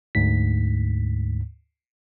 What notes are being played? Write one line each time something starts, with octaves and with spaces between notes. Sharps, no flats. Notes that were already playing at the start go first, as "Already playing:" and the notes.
D2 G#2 B6